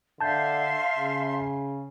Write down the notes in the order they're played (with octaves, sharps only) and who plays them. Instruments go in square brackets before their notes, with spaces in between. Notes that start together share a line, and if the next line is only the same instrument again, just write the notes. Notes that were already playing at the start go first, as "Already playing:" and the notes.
[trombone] D3 [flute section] E5 F5 C6 [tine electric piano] A5 G6
[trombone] C#3